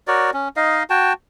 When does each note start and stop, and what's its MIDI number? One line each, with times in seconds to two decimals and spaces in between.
0.08 0.30 66
0.08 0.30 70
0.08 0.30 73
0.08 0.30 74
0.34 0.48 61
0.56 0.83 63
0.56 0.83 75
0.56 0.83 77
0.90 1.13 66
0.90 1.13 79
0.90 1.13 81